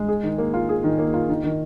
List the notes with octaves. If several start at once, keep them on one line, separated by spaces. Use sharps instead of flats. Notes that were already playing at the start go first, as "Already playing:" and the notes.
Already playing: G#3
G#4
D#3
A#3
F4
G#4
D#3
A#3
F4
D#3
D#3